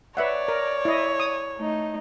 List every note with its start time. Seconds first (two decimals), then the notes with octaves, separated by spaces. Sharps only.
0.17 B4 C#5 D5 E5 F#5
0.48 A#4
0.85 E4 D#5
1.20 D#6
1.59 A3 D#4